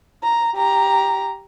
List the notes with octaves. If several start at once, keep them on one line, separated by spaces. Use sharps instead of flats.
A#5
G4 A#5